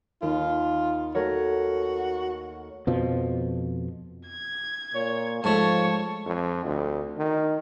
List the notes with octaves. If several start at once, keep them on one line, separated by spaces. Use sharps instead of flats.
D#2 F4
A3 F#4 A#4 C#5
F2 B2 F3
G#6
A#2 C#5
G#2 F3 A3 C#5 A5
F2
D2
D#3